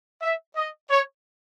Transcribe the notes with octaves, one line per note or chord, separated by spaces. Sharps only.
E5
D#5
C#5